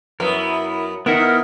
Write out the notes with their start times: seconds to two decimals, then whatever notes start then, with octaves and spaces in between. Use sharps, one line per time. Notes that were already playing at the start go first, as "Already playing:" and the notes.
0.20 F#2 B3 E4 A#4
1.06 D#3 B3 E4 A#4 D#5 E5 F#5